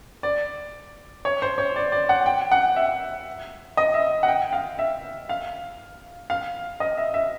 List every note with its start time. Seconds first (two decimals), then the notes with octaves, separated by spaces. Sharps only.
0.23 D5
1.25 C#5
1.42 C5
1.58 C#5
1.76 D5
1.92 D5
2.09 F#5
2.26 G5
2.51 F#5
2.76 E5
3.77 D#5
3.94 E5
4.23 F#5
4.28 G5
4.53 F5
4.79 E5
5.29 F5
6.30 F5
6.80 D#5
6.97 E5
7.14 E5